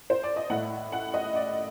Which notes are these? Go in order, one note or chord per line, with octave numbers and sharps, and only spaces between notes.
C5
D5
D#5
A2 F#5
F#5
D#5
D5